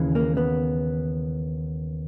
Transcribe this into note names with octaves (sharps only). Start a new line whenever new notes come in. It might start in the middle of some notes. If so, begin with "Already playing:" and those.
Already playing: D#2 C#3 E3
A#3
B3